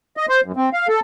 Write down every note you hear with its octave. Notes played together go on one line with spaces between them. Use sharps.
D#5
C5
F#2
C4
F5
A4